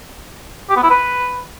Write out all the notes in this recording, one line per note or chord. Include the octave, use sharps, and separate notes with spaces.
G4
B3
E4
B4